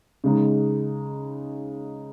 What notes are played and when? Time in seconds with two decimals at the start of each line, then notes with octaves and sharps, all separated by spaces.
0.24 C#3 G#3 D#4